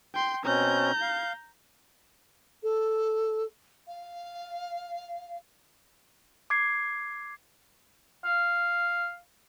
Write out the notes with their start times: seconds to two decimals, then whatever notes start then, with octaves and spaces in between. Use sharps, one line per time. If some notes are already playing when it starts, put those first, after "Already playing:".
0.14 G5 C6
0.45 B2 C4 C#4 A#5 G6
1.02 F5
2.63 A4
3.88 F5
6.50 D6 G#6 C7
8.25 F5